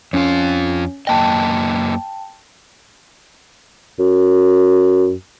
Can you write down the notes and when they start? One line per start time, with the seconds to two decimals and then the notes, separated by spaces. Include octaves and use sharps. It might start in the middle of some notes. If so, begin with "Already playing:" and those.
0.13 F2 C#4 F4 C#5
1.07 F#2 A#3 D#5 G5 A5
3.99 F#2